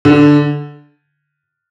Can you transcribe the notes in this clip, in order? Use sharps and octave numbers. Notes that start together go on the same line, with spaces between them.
D3